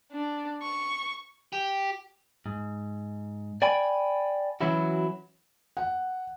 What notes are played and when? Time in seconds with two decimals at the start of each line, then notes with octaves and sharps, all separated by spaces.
0.11 D4
0.63 C#6
1.53 G4
2.46 G#2
3.62 D5 G5 G#5 B5
4.61 E3 F#3 C#4 E4 F#4
5.77 F#5